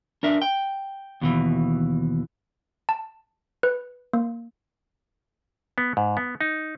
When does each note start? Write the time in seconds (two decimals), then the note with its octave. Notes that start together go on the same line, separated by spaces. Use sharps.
0.23 D4 A#4 E5
0.42 G5
1.21 D#2 B2 E3
2.89 A5
3.63 B4
4.13 A#3
5.78 B3
5.97 G#2
6.17 B3
6.41 D#4